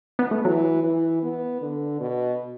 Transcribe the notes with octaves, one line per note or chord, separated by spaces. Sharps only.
B3
A3
E3 F#3
E3
B3
D3
B2